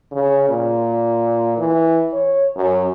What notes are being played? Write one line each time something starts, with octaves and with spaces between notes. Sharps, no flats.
C#3
A#2
E3
C#5
F#2